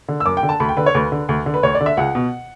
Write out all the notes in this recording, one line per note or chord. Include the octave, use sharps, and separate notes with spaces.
D3
E6
F#2 D6
G5
D3
A5
D2 B5
G5
D3 B4
C#5
D2 B4
D3
D2
D3
B4
D2 C#5
D5
D3
E5
C#2 F#5
B2